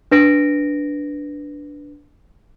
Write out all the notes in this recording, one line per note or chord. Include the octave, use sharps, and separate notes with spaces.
D4 B4 A#6 D7